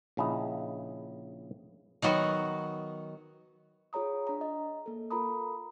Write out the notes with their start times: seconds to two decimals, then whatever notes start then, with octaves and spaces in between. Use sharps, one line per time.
0.17 A#1 C#3 E4 D#5
2.02 D#3 F#3 B3 F#4
3.93 F4 G#4 C#5 A#5 D#6
4.27 D4 A#5
4.41 D#5
4.86 A#3 A4
5.10 F4 A4 A#4 A#5 B5 D#6